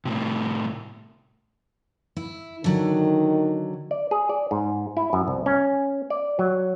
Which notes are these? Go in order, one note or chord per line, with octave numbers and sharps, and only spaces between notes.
A2 C3
E4
D3 D#3 F#3
D5
G#4
D5
G#2
E4
F#2
C2
C#4
D5
F#3